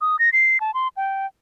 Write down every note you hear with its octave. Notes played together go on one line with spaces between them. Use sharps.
D#6
A#6
C7
A5
C6
G5